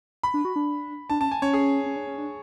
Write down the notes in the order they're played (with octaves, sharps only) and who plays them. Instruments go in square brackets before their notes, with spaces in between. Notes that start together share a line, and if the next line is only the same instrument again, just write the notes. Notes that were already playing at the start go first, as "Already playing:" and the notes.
[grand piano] B5
[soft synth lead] D4
F#4
D4
[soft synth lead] D4 [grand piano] A5
[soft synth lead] C#4 [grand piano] A5
[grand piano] G#5
[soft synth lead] C#4 [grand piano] C#5
[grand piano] G#4
[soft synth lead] C#4
D4
C#4
D4